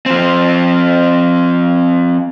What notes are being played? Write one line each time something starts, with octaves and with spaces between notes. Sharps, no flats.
F3 C4